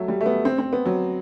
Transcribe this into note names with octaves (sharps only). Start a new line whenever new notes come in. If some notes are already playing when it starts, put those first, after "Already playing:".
Already playing: F#3 A3
G3
A3
B3
C4
C4
B3
F#3